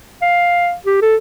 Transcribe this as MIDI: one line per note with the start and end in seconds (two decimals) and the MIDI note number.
0.22 0.74 77
0.86 1.00 67
1.02 1.16 69